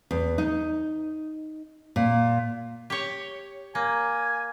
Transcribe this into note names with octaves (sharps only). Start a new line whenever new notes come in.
E2
D#4
A#2
G4 C#5
A#3 G#5